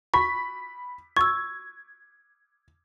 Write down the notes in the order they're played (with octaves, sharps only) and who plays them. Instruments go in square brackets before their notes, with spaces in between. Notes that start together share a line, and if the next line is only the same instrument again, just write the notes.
[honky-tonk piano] B5 B6 [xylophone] C#6
[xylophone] C#6 E6 [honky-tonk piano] G#6